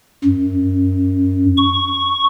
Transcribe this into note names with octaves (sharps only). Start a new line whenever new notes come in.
F#2
C#6